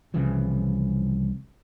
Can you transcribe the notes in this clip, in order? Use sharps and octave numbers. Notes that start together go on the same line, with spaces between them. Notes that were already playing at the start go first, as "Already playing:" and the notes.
C2 C#3 E3 F3